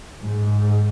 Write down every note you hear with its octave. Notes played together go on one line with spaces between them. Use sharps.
G#2